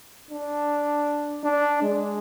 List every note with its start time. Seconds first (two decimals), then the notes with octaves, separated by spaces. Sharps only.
0.31 D4
1.44 D4
1.83 G#3